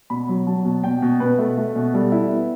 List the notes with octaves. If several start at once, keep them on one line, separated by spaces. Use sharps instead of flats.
B2 B5
F#3
F#3 A5
B2
B2 G5
B2
B2 B4
A3
A3
B2
G3 A4
E4
B3